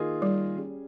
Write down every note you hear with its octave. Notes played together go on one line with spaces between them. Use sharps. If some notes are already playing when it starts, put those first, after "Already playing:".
Already playing: D#3 A#3 F4 G#4 D#5
G3
G3 C#4 G#4